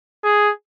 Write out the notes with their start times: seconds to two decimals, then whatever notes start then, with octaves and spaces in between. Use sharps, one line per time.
0.24 G#4